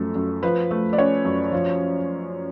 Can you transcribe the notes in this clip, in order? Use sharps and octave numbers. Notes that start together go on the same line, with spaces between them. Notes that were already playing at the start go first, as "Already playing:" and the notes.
Already playing: F#2 F3 A3 A4
F#2
F3 B4
A3
D5
C#4 C#5
F#2
F3